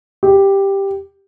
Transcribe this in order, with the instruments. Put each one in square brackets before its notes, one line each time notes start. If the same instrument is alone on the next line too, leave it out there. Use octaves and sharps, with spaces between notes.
[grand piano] G4